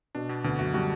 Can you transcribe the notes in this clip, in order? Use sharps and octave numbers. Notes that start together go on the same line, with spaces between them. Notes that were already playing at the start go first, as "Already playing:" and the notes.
B2 D4
B2
D2 B2 D3
F#2 F#3 F#4
G3 F#4